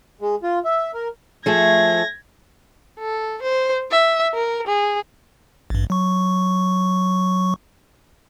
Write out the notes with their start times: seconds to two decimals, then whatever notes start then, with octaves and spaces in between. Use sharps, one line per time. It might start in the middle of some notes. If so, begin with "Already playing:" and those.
0.21 G#3
0.43 F4
0.65 E5
0.94 A#4
1.46 F3 A3 G#4 G#6 A#6
2.99 A4
3.42 C5
3.91 E5
4.34 A#4
4.67 G#4
5.70 A1 G2
5.90 F#3 C#6